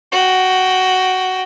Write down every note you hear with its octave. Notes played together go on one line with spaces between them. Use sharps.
F#4 G5